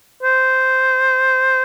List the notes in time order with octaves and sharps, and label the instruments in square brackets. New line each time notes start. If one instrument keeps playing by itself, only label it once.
[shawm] C5